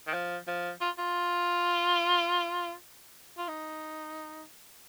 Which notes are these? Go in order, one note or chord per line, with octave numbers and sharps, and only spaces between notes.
D#3
F3
F3
F4
F4
F4
D#4